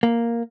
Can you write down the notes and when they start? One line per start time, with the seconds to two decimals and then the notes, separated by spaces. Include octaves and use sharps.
0.03 A#3